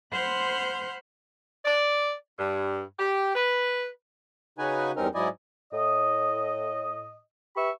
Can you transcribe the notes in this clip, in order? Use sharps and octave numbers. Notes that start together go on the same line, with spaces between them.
C5 F#5 B5 C6 F6 G6
D5
G2
G4
B4
C#3 D#4 F#4 B4 G#5
E2 G2 C4 C#4 D#4 A#4
G#2 F#3 E4 D5 D#5 G#5
A2 D#5
G4 B4 E5 B5 C#6